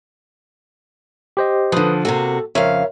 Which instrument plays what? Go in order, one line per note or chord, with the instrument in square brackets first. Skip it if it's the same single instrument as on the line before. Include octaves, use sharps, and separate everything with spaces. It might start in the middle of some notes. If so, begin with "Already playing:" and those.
[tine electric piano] G4 C5 D#5
[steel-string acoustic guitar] D3 F3 [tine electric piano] B4 D#6
[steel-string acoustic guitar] C3 A#3 F#4 [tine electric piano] A4
[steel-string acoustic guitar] F2 C#3 F5 [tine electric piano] A#4 C#5 E5